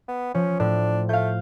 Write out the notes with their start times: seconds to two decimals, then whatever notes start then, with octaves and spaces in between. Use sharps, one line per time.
0.08 B3
0.34 F3 C#4
0.60 A2 D4
1.09 A3 F5 G6